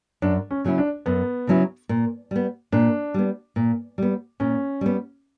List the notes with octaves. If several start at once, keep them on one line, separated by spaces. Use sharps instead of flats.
F#2 D4
C#4
C#3 F#3 C#4 E4
D4
F#2 B3
C#3 F#3 C#4 E4
A#2
G3 B3
A#2 D4
G3 B3
A#2
G3 B3
A#2 C#4
G3 B3